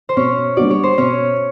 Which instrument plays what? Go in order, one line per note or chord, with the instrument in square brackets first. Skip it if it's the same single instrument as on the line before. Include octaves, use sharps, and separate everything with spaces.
[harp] C5
[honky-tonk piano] B2 [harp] C#4 C#5
[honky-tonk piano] G3 B3 D4 F#4 [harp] D5
[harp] C#5
C5
[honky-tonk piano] B2 [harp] C#4 C#5